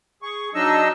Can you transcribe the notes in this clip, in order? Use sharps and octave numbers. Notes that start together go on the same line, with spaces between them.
G#4 C#6
F#3 D4 D#4 D#5 E6